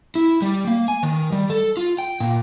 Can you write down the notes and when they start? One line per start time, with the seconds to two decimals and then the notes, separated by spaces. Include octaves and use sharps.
0.15 E4
0.42 G3
0.68 A#3
0.88 G#5
1.03 D#3
1.32 G3
1.50 A4
1.77 F4
1.98 G5
2.20 A#2